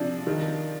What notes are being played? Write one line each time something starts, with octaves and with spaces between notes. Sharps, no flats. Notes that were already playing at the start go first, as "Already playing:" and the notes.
Already playing: C3 F3 D4
D#3